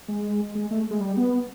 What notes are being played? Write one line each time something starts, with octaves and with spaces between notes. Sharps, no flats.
G#3
G#3
A3
G#3
G3
B3